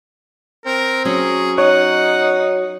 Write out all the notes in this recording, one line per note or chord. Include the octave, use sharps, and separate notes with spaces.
C4 A#4
F#3 C#4 G#4
D#4 C#5 F#5